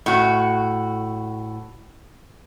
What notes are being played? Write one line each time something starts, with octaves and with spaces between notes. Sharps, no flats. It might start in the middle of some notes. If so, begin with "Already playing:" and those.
A2 F#4